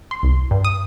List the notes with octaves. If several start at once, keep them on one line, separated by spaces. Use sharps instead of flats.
C6
C2
G2
D#6